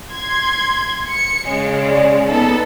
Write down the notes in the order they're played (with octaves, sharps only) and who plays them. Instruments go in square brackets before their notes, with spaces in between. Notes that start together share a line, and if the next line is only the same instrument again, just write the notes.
[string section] C6 G#6
C#7
[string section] C#3 G#3 [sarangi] C#5
[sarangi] D5
[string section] B3 A4 [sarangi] D#4